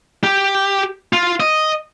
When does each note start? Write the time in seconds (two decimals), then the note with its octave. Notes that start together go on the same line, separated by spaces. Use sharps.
0.24 G4
1.13 F4
1.40 D#5